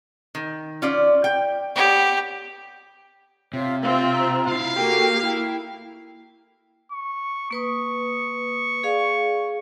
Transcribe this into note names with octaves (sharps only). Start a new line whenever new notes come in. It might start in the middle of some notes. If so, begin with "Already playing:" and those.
D#3
C#4 F4 D5
G5
B3 G4 C#5
C3 F4 C#5 E5
C4 F4 E5 F5
A#5
E4 F4 F5
A#3 F#4 G4 A4 G5
E4 G5
C#6
A#3 B4 C#6 D#6
G#4 D5 F5